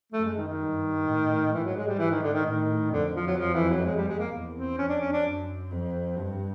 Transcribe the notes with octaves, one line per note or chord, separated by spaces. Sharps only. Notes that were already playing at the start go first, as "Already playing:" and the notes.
F#2 A3
G#3
D#3
D#3
G2
A2
G#2 E3
F#3
G#3
G3
E3
D#3
D3
D#3
A2 D#3
F2 D3
F3
F#3
F3
E3
F#3
G#3
G3
G#3
A#3
E2
C4
F2 C#4
D4
C#4
D4
F#2
F2
G2